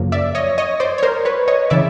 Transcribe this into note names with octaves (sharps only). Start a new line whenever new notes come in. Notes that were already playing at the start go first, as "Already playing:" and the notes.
Already playing: F#2 C#3 F3 A#3
D5 E5
C#5 D#5
C#5 D#5
C5 D5
C#5
A#4 C5
B4 C#5
C#5 D#5
C#3 E3 D5 E5